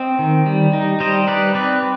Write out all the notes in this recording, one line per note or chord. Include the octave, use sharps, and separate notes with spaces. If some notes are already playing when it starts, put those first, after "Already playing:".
Already playing: C4 C5 D#5
D#3
G3
D#4
G3 C5 D#5
D#4 B4 D5
C4 B4 D5